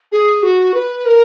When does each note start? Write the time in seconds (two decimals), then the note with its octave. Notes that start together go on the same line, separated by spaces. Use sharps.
0.12 G#4
0.43 F#4
0.74 B4
1.06 A#4